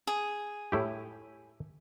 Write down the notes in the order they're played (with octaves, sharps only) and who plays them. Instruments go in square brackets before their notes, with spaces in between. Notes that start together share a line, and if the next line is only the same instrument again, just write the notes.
[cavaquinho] G#4
[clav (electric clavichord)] A2 E4 G4